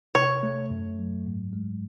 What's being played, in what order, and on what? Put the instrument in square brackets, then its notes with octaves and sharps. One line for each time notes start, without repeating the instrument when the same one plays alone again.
[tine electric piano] C3 [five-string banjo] C#5
[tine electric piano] A3
F#2
F#3
G#2
G#3